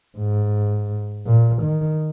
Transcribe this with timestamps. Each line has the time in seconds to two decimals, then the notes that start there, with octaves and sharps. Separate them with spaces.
0.18 G#2
1.26 A#2
1.63 D#3